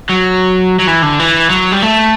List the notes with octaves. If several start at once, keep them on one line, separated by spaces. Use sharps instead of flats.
F#3
F#3
E3
D3
E3
F#3
G3
A3